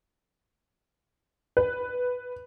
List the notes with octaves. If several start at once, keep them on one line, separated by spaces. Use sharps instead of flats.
B4